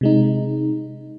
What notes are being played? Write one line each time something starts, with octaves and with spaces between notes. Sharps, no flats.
C3 G#3 D#4